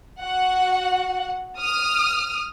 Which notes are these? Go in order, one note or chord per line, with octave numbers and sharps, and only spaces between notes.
F#4 F#5
D#6 F6